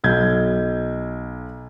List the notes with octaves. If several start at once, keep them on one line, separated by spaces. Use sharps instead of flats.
B1 G6 G#6